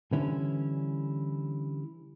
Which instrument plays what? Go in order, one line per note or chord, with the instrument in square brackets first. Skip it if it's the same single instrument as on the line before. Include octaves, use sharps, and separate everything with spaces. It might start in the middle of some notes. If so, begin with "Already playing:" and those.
[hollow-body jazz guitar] D3 E3 G3 C#4 E4